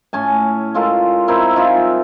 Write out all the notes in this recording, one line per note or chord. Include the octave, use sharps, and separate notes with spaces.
A2 C#4 G#5 A5
G#3 F4 A4 A#4
C4 D#4 E4 A#4
D#4 F4 G#4 E5
G3